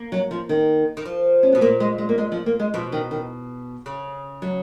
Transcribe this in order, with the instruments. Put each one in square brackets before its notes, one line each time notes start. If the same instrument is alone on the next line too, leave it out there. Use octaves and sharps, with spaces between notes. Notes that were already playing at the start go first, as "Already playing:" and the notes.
Already playing: [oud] A#3
[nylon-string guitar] F#3
F3
D#3
[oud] D#3
F3
[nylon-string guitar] C#4
[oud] B2 [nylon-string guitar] B3
[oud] A#2 [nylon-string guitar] A#3
[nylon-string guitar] G#3
G#3
A#3
G#3
F3
A#3
G#3
[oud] B2 [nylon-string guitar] F3
[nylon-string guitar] D#3
D#3
[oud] C#3
[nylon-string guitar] F#3